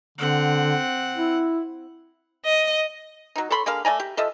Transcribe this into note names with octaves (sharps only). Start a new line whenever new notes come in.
D3 C4 F#5
E4
D#5
F#3 D#4
A4 C#5 B5 C6
D3 A#3 G#4 F5
A3 D5 G#5 A#5
G4
F3 A4 D#5 E5